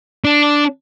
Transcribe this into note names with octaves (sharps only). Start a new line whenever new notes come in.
D4